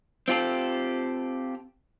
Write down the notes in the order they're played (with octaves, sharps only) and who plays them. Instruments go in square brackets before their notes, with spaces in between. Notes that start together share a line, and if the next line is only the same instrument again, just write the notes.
[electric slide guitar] C4 F4 G4 A4